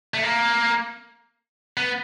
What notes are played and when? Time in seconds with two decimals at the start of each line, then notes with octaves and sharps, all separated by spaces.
0.14 A3
0.23 A#3
1.77 B3